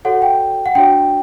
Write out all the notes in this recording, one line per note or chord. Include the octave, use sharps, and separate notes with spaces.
F#4 A4 C#5 F#5
G5
F#5
D4 F#4 C#5 G5